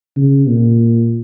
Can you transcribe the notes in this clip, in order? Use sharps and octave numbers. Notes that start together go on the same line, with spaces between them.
C#3
A#2